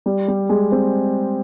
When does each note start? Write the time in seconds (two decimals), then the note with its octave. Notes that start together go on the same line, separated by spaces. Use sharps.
0.06 G3
0.28 G3
0.49 G#3
0.72 C4